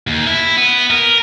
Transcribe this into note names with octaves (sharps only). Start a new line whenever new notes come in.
D#2
E4
B3
A#4